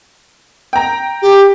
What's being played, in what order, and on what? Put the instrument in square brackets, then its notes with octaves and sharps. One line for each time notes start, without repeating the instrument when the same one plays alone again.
[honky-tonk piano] G5 A#5
[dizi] G4